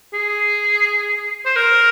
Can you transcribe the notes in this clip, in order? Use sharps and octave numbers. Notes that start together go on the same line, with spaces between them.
G#4
C5
A#4